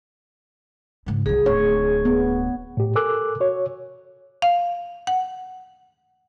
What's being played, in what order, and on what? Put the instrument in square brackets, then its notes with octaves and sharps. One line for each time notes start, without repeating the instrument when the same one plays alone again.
[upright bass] G#2 C#3
[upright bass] C2 F#3 [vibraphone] G#4
[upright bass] D1 [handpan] C#5
[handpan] B3
[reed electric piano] A2 G4
A4 A#4 G#5 D6 E6 F#6
F#4 C#5
[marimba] F5
F#5